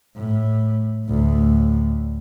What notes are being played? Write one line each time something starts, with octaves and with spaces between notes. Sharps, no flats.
A2
D2 A2